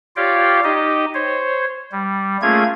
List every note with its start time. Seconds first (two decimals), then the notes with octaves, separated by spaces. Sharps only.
0.16 F4 G4 C#5 D5 F5 G5
0.64 D#4 G4 D#5
1.14 C5 C#5
1.92 G3
2.42 A3 A#3 C#4 F4 G#4 G#6